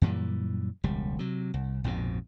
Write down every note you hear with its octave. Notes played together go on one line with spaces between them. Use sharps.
F#2 A#2 E3 G3
E1 C#2 G3
C3 F#3
C2
A#1 F2 G#2 B2